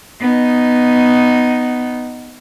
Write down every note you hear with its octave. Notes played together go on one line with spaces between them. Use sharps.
B3 D#4